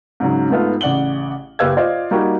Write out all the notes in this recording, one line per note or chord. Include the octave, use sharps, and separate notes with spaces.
G#2 C#3 F#3
G#2 A3 B3 F4
A1 C#3 D5 F#5 F#7 G7
F#1 G4 B4 F5 E6 G#6
F4 C5 D5 D#5 F5
G3 A#3 D#4 F#4 G4